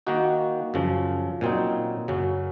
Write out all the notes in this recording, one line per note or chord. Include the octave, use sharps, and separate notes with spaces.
D#3 A#3 D#4 F#4
F#2 C#3 F3
A#2 F#3 C4 D#4
F#2 C#3 F#3